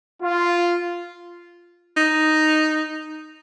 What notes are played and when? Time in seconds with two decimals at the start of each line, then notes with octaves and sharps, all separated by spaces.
0.22 F4
1.97 D#4